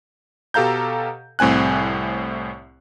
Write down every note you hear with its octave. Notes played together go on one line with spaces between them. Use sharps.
B2 G4 A4 F5 A#5 G6
C2 A2 C4 G#5 F#6